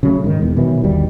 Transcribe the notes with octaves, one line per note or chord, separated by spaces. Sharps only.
C#3 F#3 A3
G#2 D#3
E1 E2
B2 D#3 E3 F#3
G1 D#2 B2 G3